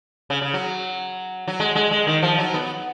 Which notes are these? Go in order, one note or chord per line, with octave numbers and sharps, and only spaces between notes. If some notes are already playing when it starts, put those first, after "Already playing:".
C#3
C#3
F#3
F#3
G#3
G#3
G#3
D#3
F3
F#3
B3